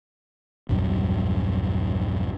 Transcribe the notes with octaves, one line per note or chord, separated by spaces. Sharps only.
A#1 E2 G2 F#3